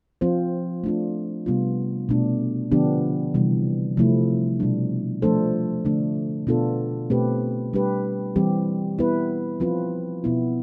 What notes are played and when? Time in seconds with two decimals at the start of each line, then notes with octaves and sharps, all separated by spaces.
0.21 F3 C4 F4 C5
0.84 A3 D4 F4
1.46 C3 G3 B3 F4
2.09 B2 A3 D4
2.72 D3 F3 B3 D4 G4
3.34 C3 E3 G3
3.97 C3 F3 A3 E4
4.60 B2 G3 D4
5.22 F3 A3 D4 A4 C5
5.85 D3 A3 D4
6.47 B2 B3 D4 F4 A4
7.10 B2 A3 C4 G4 B4
7.73 G3 D4 G4 B4
8.36 E3 G3 C4 G4
8.99 B3 E4 B4
9.60 F3 C4 F4 B4
10.24 B2 B3 E4